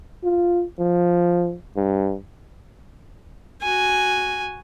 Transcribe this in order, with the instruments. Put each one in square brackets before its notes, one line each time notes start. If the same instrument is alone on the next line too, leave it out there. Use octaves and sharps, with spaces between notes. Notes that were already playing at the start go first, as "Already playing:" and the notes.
[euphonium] F4
F3
G2
[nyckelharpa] F#4 G#5